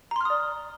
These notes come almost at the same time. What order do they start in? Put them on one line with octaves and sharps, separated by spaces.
A#5 C6 F6 D#6 D5